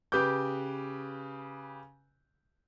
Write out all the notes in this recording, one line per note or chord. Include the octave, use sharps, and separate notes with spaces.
C#3 G4 B4 D6 G6